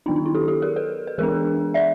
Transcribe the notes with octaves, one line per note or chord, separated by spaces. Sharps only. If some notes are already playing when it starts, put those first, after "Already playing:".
D#3 F#3 B3 D4 D#4 F4
D#4
E4
G4 A4
G4 A4
G#4 A#4
A4 B4
B4
E3 G#3 B3 D4 G#4 A#4
D5 E5